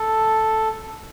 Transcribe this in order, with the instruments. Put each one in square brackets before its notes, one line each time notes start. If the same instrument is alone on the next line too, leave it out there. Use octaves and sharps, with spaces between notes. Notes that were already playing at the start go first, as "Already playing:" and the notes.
Already playing: [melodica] A4